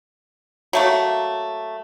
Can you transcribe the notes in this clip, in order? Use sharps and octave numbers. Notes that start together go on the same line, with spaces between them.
F#3 A3 A#3